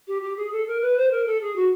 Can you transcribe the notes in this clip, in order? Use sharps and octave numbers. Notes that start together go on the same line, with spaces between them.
G4
G4
G#4
A4
A#4
B4
C5
A#4
A4
G#4
F#4